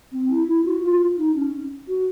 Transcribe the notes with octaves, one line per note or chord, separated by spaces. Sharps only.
C4
E4
E4
F#4
F4
D#4
C#4
F#4